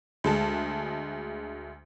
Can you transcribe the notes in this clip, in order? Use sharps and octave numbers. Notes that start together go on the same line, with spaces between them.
D2 G#3 A5